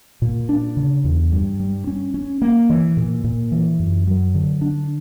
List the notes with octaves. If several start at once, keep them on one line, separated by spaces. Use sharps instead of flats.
A#2
D4
C#3
E2
G2
G3
C#4
C#4
A#3
E3
A#2
A#2
E3
F#2
F#3
D3
D4